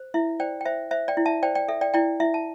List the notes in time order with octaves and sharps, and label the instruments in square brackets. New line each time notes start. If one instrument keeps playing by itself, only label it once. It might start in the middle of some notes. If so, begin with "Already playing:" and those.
Already playing: [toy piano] C5
E4 E5
C5 D5 G5
G5
C5 E5
C5 E5
D5 G5
E4
E5 A5
C5 D5 G5
D5 G5
A4 E5
D5 G5
E4 D5 G5
E4 E5
A5